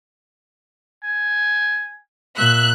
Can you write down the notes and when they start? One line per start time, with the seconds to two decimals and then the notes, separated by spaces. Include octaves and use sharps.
1.04 G#5
2.38 A#2 E5 F#6